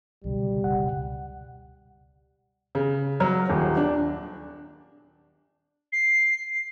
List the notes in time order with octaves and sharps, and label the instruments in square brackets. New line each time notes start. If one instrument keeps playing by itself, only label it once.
[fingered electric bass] C#2 D3 F#3 [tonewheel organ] B2 [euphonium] G3
[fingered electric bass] F#1 C#2 [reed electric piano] F#5
[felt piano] C#3
F#3
D#1
D4
[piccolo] C7